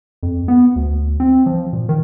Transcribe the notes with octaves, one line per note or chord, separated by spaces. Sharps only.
F2
B3
D2
C4
F3
A#2
D#3